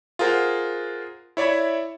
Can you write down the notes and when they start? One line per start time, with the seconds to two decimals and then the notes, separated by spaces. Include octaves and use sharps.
0.19 F4 G#4 A#4 C5 F#5
1.37 E4 C#5 D5 E5 B5